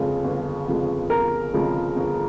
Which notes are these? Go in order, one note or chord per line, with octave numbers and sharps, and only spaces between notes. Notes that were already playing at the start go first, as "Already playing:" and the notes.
Already playing: G1 F2 C#3 F3 G#3
G1
F2 C#3 F3 G#3
G1 A#4
F2 C#3 F3 G#3
G1